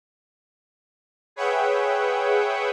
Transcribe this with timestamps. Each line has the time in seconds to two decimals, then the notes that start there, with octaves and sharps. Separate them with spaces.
1.36 G#4 B4 C#5 E5 F#5 G5